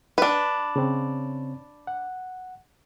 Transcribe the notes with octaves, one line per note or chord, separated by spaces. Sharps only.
D4 B4
C#3 C4 C#5
F#5